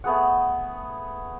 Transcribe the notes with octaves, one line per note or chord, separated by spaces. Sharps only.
A3 B3 G#4 F#5